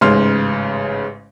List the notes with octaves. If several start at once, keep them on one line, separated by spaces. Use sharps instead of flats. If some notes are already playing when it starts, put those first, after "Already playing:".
A1 G#2 C#3 C6 F6